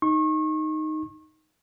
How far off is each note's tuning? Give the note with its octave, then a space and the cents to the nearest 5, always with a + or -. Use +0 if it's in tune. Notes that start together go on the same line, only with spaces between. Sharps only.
D#4 +0 C#6 -35